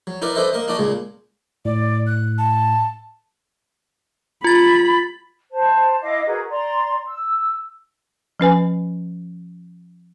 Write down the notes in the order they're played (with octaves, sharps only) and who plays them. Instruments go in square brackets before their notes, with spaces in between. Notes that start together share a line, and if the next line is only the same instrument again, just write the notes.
[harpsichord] F#3
D#4 E4 A#4 B4 D5
D4 A4 B4 C5 D#5 E5
A#3 A#4 D#5
D4 D#4 F#4 D5 D#5
C#2 A#2 G#3
[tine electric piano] A2 [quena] D5
[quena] F#6
A5
[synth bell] F4 A6 [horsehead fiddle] B5
[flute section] C5 A5
E4 D#5 F5 D6
F#4 G#4 A#4 B4
D5 A#5 C6
E6
[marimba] F3 C#4 B4 G#5